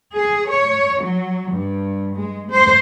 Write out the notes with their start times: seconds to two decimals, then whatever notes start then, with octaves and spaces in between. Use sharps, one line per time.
0.15 G#4
0.49 C#5
1.01 F#3
1.49 G2
2.17 G#3
2.51 C5